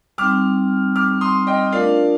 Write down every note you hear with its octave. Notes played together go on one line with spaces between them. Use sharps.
G3 C4 D#4 D6 F6
D6 F6
C6 D#6
D#5 G5
A3 D4 F4 A#4 D5 F5